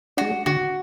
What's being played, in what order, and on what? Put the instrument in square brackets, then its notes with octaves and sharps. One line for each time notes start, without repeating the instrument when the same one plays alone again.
[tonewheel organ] G#3 D4 [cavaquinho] F#4
[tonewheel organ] D3 [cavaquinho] F#4